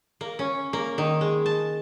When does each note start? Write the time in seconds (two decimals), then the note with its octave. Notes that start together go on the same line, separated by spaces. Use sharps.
0.21 A#3
0.39 C#4
0.73 A#3
0.98 D#3
1.21 G#3
1.46 A5